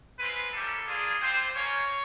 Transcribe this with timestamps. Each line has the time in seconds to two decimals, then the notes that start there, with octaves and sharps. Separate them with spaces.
0.19 G#3 C4 F4 B4
0.53 G3 A#3 C#4 E4 G4 A4
0.87 A#3 D4 F4 G#4
1.21 G3 C4 F4 C5
1.55 A#3 C#4 F4 C#5